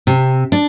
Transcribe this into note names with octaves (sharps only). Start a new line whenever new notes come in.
C3
D4